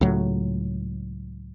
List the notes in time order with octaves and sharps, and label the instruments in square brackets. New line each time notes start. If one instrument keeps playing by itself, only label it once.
[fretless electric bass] C#2 A2 F#3